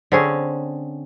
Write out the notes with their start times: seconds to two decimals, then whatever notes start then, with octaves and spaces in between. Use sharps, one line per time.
0.12 D3 C4 C#4 G#4